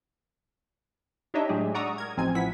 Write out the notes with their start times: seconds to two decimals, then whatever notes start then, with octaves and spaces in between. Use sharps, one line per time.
1.34 D4 D#4 G4 C#5 D#5 E5
1.49 A2 F#3 G#3 D4 G4 G#4
1.74 D5 F#5 A#5 C#6 D#6 E6
1.98 A#4 G#6
2.17 A1 F3 C4 D#4 G#5 G#6
2.35 A1 F3 E4 F#5 B6